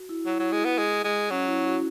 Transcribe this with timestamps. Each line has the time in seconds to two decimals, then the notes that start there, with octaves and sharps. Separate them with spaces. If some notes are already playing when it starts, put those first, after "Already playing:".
Already playing: F#4
0.09 E4
0.26 F#3 E4
0.39 F#3
0.52 G#3
0.65 B3
0.78 G#3
1.04 G#3
1.30 F#3 C#4
1.47 E4
1.65 F#4